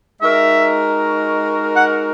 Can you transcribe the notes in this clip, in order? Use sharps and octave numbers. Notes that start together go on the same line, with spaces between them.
G#3 D#4 F#4 A#4 E5
F#5